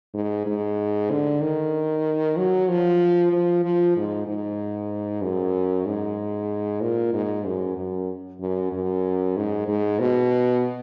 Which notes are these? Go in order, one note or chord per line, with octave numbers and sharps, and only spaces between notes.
G#2
G#2
D3
D#3
F#3
F3
F3
F3
G#2
G#2
F#2
G#2
A#2
G#2
F#2
F#2
F#2
F#2
G#2
G#2
B2